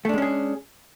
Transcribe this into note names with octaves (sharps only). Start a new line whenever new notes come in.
G#3 A3 C#4 D4 G#4